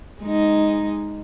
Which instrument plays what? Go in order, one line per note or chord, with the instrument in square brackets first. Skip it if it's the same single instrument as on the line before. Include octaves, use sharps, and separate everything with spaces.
[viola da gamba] G#3 D#4